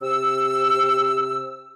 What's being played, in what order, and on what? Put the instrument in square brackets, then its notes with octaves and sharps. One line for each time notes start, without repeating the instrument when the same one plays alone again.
[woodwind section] C3 E6